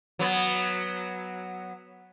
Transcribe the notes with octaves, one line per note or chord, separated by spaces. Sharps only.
F#3 B3